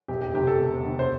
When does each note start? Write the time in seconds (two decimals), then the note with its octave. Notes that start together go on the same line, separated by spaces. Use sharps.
0.08 E1 G4
0.21 G4
0.34 D2 C3 G4
0.47 A4
0.59 E1
0.84 D2 C3
0.99 C5